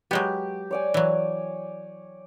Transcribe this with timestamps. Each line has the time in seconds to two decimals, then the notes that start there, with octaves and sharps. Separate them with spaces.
0.11 F#3 G#3 B3 G4
0.71 C#5 D5 G#5
0.94 E3 F#3